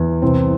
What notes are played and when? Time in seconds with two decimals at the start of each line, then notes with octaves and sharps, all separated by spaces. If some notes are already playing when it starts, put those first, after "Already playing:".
Already playing: E2
0.22 C2 C4